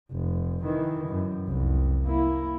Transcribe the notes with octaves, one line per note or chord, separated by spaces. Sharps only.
F1
D#3 E3
F#2
F1 C2
A#3 E4